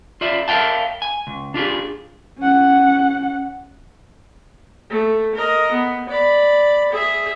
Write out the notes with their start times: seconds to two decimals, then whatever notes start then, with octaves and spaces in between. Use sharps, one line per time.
0.21 F4 D5 E5
0.48 A#4 E5 F5 G5 A5
1.02 G#5
1.27 C#2
1.54 D4 F4 G4 G#4
2.39 C#4 F#5
4.90 A3
5.35 A#4 D#5
5.72 B3
6.09 D5 B5
6.92 G#4 E5